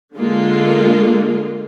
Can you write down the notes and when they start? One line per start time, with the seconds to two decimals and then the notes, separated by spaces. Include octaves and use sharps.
0.15 D3 G#3 A#3 F4